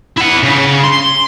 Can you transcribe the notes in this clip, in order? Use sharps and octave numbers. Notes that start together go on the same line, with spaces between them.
E4 F#5
C#3
C6